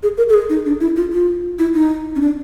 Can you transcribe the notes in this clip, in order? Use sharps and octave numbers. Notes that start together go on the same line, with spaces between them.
G#4
A#4
A4
G#4
D#4
D4
E4
F4
F4
E4
D#4
C#4
D4